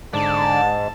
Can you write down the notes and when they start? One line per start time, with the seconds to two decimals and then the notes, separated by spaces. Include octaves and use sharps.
0.14 G#2 D3 D5 A5